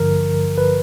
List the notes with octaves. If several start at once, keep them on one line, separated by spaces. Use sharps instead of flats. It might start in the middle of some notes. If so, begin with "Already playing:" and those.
Already playing: A1 G2 D3 F3 A#4
B4